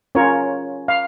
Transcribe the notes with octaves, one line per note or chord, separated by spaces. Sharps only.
C#4 F4 A#4 C#5
F5